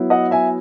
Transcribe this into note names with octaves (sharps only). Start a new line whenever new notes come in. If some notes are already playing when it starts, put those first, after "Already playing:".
Already playing: F#3 B3 E4
D#5 F#5
E5 G#5